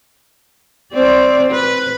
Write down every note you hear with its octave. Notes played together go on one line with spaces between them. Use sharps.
C4 D5
B4